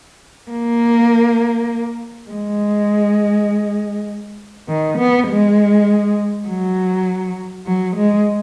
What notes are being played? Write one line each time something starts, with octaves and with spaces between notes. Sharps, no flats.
A#3
G#3
D#3
B3
G#3
F#3
F#3
G#3